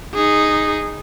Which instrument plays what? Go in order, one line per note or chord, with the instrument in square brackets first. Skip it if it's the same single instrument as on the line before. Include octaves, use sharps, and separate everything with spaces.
[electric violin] D#4 G#4